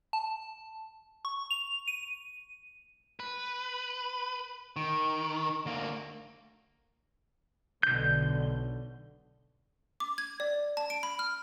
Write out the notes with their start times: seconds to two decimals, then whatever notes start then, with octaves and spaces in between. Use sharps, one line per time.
0.13 A5
1.25 C#6
1.51 F7
1.88 D#7
3.20 B4
4.76 D#3
5.66 D2 A#3
7.83 B1 B2 D3 G6
10.00 D6
10.18 G#6
10.40 D5
10.77 A5
10.90 D7
11.03 B5
11.19 F6